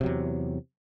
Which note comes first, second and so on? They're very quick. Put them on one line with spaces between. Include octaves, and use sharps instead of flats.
C3 F#3 E2